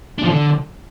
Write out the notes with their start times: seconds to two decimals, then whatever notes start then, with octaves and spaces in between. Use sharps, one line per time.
0.19 D4
0.24 F3
0.30 D3